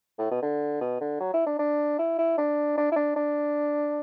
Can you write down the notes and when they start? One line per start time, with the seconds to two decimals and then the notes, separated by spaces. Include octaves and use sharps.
0.19 A2
0.31 B2
0.42 D3
0.81 B2
1.01 D3
1.20 F#3
1.34 E4
1.46 D4
1.59 D4
1.99 E4
2.19 E4
2.38 D4
2.77 D4
2.92 E4
2.96 D4
3.16 D4